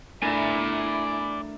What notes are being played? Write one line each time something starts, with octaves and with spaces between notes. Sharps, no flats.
A3 D4 E4 A#4 D5 G#5